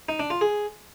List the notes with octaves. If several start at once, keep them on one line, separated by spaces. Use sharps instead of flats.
D#4
D4
F4
G#4